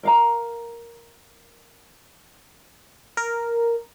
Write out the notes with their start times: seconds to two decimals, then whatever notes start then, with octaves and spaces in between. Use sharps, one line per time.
0.03 A#4 F5 A#5
3.17 A#4